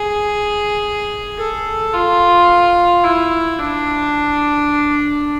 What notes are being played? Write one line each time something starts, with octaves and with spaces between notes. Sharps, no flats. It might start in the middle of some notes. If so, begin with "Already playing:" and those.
Already playing: G#4
A4
F4
E4
D4